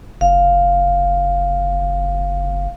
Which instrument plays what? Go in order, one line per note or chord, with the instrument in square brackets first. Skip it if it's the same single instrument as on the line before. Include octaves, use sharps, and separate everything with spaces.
[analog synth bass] F#1 [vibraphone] F5